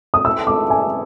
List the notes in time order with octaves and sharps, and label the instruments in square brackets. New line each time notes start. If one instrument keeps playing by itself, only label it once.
[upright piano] D#6
[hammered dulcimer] E3 A3 C4 [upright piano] E6
[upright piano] D6
G#5